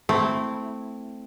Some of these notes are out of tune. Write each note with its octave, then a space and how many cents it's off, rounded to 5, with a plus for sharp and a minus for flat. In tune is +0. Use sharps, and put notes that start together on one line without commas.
A3 +0 C4 -5 E4 +0